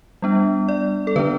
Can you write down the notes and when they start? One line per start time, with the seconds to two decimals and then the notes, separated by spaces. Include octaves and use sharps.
0.22 G3 B3 D4
0.69 D5
1.07 A4
1.16 D3 B3 D4 B4